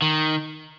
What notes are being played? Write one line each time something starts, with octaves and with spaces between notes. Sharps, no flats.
D#3